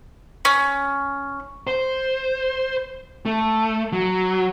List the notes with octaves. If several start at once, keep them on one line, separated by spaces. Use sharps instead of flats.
C#4
C5
A3
F#3